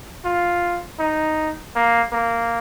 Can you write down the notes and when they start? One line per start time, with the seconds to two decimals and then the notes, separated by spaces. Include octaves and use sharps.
0.25 F4
1.00 D#4
1.75 A#3
2.12 A#3